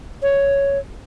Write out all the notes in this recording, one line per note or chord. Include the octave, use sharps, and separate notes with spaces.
C#5